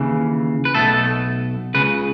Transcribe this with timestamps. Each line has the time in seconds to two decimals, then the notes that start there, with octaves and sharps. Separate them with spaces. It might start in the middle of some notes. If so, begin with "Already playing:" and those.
Already playing: D#2 C#3 E3
0.65 B4
0.75 B1 B2 A3 A4
1.74 C#2 C#3 B4